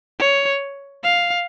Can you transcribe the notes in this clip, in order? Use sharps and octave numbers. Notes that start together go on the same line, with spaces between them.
C#5
F5